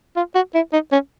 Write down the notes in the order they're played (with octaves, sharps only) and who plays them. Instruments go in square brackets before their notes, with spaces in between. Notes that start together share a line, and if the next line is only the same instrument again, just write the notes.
[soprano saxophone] F4
F#4
E4
D#4
C#4